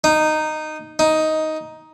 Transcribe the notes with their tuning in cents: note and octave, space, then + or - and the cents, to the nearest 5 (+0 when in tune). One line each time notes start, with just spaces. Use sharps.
D#4 -10
D#4 +10